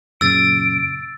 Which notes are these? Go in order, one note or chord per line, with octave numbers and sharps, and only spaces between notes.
F#2 A#2 C#3 E6 A6 D7